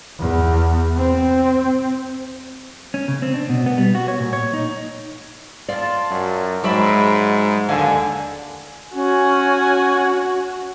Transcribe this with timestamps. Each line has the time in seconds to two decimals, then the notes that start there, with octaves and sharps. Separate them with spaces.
0.19 E2
0.97 C4
2.94 C#4
3.08 C#3
3.22 C4
3.34 D4
3.49 B2
3.66 B3
3.78 G3
3.95 F#4
4.08 C#5
4.20 A#2
4.33 C#5
4.54 D#4
5.69 F4 D5 A5
6.11 F#2
6.64 G#2 F#3 G#3 D5 E5 B5
7.69 D#2 D3 F5 G#5
8.94 C#4 F#4 G#5